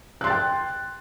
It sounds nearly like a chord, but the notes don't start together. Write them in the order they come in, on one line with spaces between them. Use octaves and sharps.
F#6 C6 A6 G5